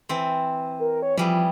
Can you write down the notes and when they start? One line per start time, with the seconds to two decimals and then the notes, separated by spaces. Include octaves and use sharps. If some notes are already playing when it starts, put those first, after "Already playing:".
0.09 E3 C4
0.79 A#4
1.02 C#5
1.17 E3 F3 G3 G#4